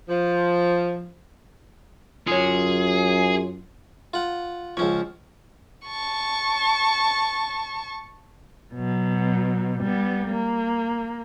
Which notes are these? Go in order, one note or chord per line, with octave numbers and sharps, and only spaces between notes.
F3
F#2 F4 G#4 C#5
F4 F#5
C#2 F3 C#4 C#5
A5 C#6
B2 F#3
G3 B3
A#3